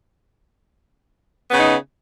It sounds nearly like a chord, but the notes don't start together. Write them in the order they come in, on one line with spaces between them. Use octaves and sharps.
B3 C#3 D#4